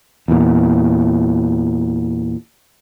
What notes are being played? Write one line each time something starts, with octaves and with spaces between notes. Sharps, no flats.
E2 A#2